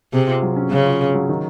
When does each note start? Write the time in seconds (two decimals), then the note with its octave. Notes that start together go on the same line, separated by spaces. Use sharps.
0.13 C3 G#4
0.27 F4
0.43 F#3
0.56 C#4
0.70 C#3 F#3
0.86 F4
1.01 G#4
1.14 F#3
1.29 D#3